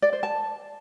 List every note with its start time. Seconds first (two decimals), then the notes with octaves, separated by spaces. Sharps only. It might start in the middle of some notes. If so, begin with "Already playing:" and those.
0.02 D5
0.13 C5
0.23 A5